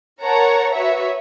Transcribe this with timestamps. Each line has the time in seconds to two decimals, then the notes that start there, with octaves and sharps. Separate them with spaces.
0.22 A#4 C#5 F#5 A5 A#5
0.73 F#4 B4 C#5 E5